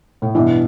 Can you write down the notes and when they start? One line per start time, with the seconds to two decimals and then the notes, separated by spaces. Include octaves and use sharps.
0.22 A2
0.35 G2 B2 E3